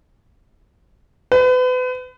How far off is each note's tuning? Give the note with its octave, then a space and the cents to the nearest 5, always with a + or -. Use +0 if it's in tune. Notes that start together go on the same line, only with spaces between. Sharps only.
B4 +35